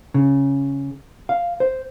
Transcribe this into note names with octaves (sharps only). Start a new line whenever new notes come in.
C#3
F5
C5